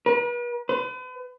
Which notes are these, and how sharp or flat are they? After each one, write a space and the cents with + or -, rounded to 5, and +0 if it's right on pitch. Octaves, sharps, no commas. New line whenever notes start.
B4 -40
B4 +40